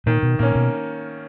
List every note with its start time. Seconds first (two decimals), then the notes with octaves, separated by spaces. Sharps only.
0.06 A#2 D#3
0.23 B2
0.39 A#2 A#3 C#4
0.55 B2